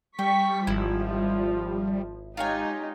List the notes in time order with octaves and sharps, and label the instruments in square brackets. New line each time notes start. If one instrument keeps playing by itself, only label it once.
[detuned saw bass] G3 [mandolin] G5 [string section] C#6 B6
[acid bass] G#1 [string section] F3 [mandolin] E4
[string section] G#3 D#4 G4 [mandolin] F4 C#5 G#5